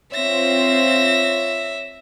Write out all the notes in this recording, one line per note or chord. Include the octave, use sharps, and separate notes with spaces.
C4 F4 C#5 E5 A#6